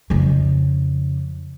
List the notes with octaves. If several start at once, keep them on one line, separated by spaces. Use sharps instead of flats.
F2 C#3